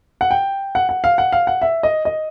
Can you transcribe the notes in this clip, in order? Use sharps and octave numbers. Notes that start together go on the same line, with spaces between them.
F#5
G5
F#5
F#5
F5
F#5
F5
F#5
E5
D#5
D#5